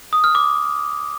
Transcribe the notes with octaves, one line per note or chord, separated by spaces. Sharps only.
D#6
F6
D6